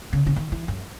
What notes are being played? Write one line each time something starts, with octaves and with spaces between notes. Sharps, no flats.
C#3
C#3
D#3
E3
F#2